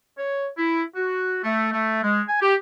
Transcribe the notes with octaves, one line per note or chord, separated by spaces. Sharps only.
C#5
E4
F#4
A3
A3
G#3
G#5
G4